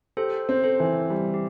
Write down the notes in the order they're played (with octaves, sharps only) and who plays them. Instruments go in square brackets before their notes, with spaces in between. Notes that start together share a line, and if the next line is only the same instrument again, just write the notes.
[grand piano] G4 [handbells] A4 C5
[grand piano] C4
[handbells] A4 C5
[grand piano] E3
G3
[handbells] G4